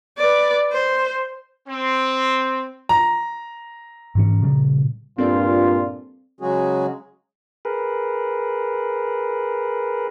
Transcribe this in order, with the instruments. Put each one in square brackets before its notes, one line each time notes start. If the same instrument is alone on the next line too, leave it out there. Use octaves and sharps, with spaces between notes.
[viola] B4 D5
C5
[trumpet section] C4
[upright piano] A#5
[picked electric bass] G#2 E3 C#4
A#2 C#3 G3
[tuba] G2 [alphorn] A#2 [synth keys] C4 A4 D5 [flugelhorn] F4
[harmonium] C#3 F#3 G#3 C#4 F#4 G#4
[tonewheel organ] G#4 A#4 B4